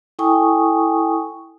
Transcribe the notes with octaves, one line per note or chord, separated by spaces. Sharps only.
E4 A4 G5 G#5 C#6 D#6